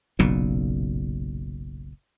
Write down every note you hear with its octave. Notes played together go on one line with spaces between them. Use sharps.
F#1 B1 A#2